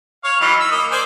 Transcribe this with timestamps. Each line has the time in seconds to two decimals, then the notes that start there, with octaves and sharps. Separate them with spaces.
0.24 C#5 F5
0.41 E3 F#3 D#4
0.60 E6
0.72 A#3 D#5
0.92 C5 D5 G#5